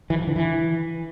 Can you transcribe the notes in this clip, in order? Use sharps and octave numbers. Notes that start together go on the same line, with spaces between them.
E3
F3
D3
E3